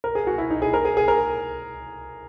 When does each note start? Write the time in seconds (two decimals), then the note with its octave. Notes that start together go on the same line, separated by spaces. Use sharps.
0.04 A#4
0.15 G#4
0.27 F#4
0.38 E4
0.50 D#4
0.62 G#4
0.73 A#4
0.85 G#4
0.97 G#4
1.08 A#4